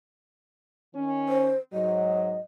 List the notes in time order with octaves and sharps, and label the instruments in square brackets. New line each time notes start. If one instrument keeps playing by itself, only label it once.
[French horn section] D#3 C#4
[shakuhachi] C5
[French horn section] G#2 F#3 [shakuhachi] D#5